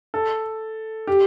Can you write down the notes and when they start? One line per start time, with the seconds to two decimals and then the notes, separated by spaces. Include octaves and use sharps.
0.14 A4
1.07 G4